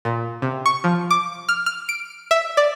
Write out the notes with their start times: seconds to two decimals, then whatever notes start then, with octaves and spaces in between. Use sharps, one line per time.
0.05 A#2
0.42 C3
0.66 C#6
0.84 F3
1.11 D6
1.49 F6
1.66 F6
1.89 D7
2.31 E5
2.57 D5